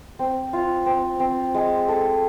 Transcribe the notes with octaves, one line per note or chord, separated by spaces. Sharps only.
C4
F4
C4
C4
G#3
A4